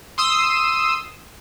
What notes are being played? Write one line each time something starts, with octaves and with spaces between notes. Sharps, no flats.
C6 D#6 E6